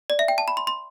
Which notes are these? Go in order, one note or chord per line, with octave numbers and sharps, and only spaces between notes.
D5
E5
G5
A5
B5
C6
C6